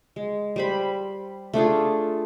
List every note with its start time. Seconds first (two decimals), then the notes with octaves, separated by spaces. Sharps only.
0.16 G#3
0.56 G3 C5 B5
1.54 A3 D4 F4 G#4